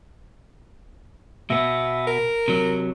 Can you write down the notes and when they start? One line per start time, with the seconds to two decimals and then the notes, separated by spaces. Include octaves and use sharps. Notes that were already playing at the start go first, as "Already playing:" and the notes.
1.50 B2 B3 E5
2.07 A#4
2.48 C3 F#3